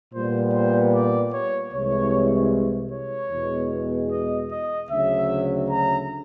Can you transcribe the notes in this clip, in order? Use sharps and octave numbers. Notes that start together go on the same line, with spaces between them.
A#2 G3 B3 C5
C5
D5
C#5
C2 C3 E3 G#3 C#5
C#5
E2 B2 G#3
D#5
D#5
D2 C#3 F#3 E5
A#5